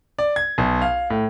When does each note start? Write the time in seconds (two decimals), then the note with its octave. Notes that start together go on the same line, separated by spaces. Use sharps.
0.19 D5
0.36 G#6
0.58 B1
0.82 F5
1.10 A2